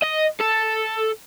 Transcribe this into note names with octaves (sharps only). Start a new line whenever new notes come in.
D#5
A4